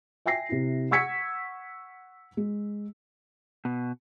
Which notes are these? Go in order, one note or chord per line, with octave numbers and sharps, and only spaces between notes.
E5 G5 G#5 A#6 C7
C3 E4
F#5 C#6 E6 G#6 B6 C#7
G#3
B2